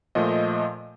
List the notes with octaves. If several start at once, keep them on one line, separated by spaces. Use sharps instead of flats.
A#2 F3 A3 D#5